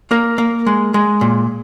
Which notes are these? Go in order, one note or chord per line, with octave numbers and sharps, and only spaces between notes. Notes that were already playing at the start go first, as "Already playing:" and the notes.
A#3 A#4
A#3
G#3
G#3
A#2